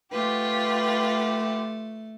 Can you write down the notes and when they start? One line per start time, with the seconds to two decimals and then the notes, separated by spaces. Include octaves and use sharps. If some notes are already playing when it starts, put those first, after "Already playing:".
0.11 A3 F4 G4 B4 F#5